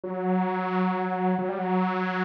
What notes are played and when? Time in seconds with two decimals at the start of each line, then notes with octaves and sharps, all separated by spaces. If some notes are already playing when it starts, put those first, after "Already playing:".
0.04 F#3
1.38 F#3
1.49 G3
1.58 F#3